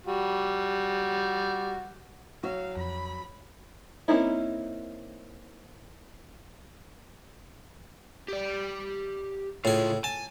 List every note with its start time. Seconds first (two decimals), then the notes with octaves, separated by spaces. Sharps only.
0.06 G3 F#4
2.43 F#3 F#4 F5
2.77 F2 B5
4.08 A#3 C4 C#4 D#4 E4
8.28 G4 D5
9.65 C#2 A2 F4 G#4
10.04 G#5 A5